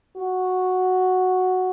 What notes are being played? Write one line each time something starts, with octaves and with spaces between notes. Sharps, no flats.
F#4